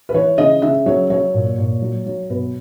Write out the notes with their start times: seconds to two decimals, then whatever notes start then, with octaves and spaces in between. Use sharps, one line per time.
0.09 B4
0.14 E3 C#5
0.38 C#3 D#5
0.62 C#3 E5
0.86 F#3 C#5
1.10 F#3 C#5
1.34 A#2
1.58 A#2
1.82 F#3
2.06 F#3
2.30 B2 B4